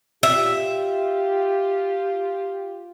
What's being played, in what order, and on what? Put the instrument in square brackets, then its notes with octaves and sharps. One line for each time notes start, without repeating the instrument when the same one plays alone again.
[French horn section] F4 G4 [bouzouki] E5